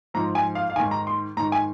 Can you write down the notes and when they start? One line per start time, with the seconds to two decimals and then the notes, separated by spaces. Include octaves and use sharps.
0.14 G#2 F3 A#5
0.35 G#5
0.55 F5
0.70 F5
0.76 D#3 G#5
0.80 G#2
0.91 A#5
1.07 C6
1.37 G#2 A#5
1.40 D#3
1.52 G#5